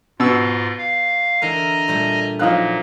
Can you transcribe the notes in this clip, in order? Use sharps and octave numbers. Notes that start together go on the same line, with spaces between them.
G#2 B2 F4 E6
F5
D3 E3 A#4 D#5 G#5 A#5
A#2 G3 A3
A#2 F3 F#3 D#4 F4 F#6